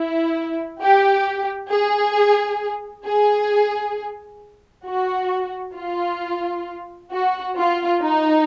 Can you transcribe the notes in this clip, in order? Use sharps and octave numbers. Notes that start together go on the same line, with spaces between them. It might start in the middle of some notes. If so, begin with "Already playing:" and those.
Already playing: E4
G4
G#4
G#4
F#4
F4
F#4
F4
D#4